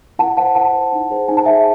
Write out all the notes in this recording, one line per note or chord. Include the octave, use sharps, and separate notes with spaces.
E4 F#5 A5
C5 F#5 A5
E4 F#5 A5
C5
D#4
G#4 C5
D#4 G#5
A5
G#4 C5 E5 G#5